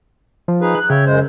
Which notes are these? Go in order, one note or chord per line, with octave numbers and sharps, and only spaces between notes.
F3
D#4 G#4 B4
F#6
C#3 C#5 E5 G5
F#2 G#3 C5